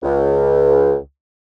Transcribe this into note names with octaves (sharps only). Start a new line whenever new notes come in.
C#2